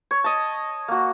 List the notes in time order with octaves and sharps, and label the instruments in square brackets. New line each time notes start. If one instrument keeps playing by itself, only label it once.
[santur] C#5
D#5 A5
A#3 F#4